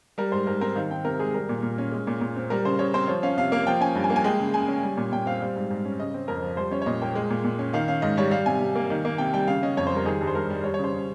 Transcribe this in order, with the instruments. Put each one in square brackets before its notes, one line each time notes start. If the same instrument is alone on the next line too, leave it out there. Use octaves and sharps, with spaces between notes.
[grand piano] G3 A#4
G#2 C5
G#2 A#4
C4 A#4
D#3 F5
C4 G5
C3 A#4
G#3 G#4
G3 A#4
A#2
A#2
C#4
G#3
A#2
A#2
C4
G3 A#4
C#3 C5
C#3 C#5
C4 C5
F3 C#5
C#4 F5
C3 F5
A#3 F5
F3 G5
C#4 G#5
G2
G#5
A#3
G#5
G#3 G5
C#3
C#3 G#5
C#4
G3
A#2
A#2 G5
C4 F5
G3
G#2
G#2
C#4
C#3 D#5
C4
F2 A#4
F3
G3 C5
C#4 C#5
C#5
A#2 D#5
A#3 G5
G#3
A#2
A#2
C#4
D#3 F5
C#4 F5
G#2 D#5
G3 C#5
G3 F5
C3 G#5
C3
A#3
D#3
A#3
C3 G5
G3 G5
C#3 F5
C#4 D#5
F2 C#5
C5
G3 A#4
D#3 G#4
G2
C5
G2 A#4
G3
G3 C#5
C#3 C#5
C5
C#3